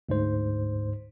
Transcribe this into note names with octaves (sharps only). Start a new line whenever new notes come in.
D2 G#2 C5